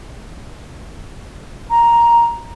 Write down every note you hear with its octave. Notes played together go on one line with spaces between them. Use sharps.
A#5